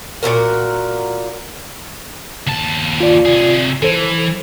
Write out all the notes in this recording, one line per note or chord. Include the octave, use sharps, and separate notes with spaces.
A#2 E3 F#4 A#4
D#2 A5
F4 D5
C3 G#4
E3 A4 C5